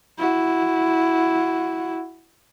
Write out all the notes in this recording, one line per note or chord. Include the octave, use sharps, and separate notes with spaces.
E4 F#4